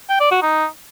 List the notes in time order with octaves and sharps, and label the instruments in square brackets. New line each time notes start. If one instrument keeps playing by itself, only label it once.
[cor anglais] G5
D5
F#4
D#4